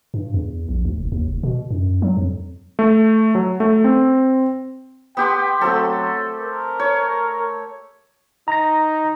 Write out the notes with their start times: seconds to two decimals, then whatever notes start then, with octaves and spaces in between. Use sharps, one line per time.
0.14 G2
0.34 E2
0.69 A#1
0.85 D2
0.98 F1
1.12 D#2
1.27 F1
1.43 B2
1.71 F#2
2.02 F#3
2.17 F2
2.79 A3
3.35 F#3
3.60 A3
3.84 C4
5.17 B3 G4 G5 C6
5.61 F#3 A3 C4 A4
6.40 A#4
6.80 C#5
8.48 D#4 A#5 A#6